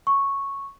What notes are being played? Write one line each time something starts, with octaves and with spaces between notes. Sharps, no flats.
C#6